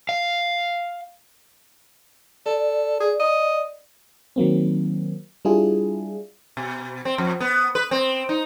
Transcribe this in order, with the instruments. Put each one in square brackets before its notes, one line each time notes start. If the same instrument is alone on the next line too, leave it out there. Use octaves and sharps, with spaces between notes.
[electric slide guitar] F5
[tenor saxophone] A4 [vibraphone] D5
[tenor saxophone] G#4
D#5
[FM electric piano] D#3 F#3 A#3 C4
G3 D4 E4 F4 G#4
[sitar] B2
C4
F2
B3
B4
C4
D#4